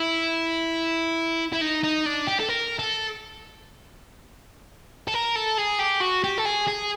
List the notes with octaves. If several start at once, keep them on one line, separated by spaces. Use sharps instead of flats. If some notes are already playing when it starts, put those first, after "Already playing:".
Already playing: E4
E4
D#4
D#4
D4
G4
A4
A#4
A4
A4
A#4
A4
G#4
G4
F#4
G4
A4
G#4
G#4